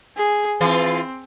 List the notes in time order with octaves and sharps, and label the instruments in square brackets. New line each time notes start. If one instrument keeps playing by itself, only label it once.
[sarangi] G#4
[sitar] E3 F4 G#4 [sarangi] C4